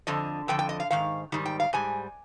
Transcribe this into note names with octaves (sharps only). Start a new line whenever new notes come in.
F2 D3 F3 D#5
F2 D3 F3 G5
G5
D#5
F5
G#2 D#3 F5
G#2 D#3 G3
G5
F5
G#2 G3 G#5